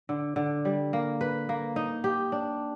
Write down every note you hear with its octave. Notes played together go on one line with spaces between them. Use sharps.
D3
D3
G3
A#3
B4
A#3
D#4
G4
D4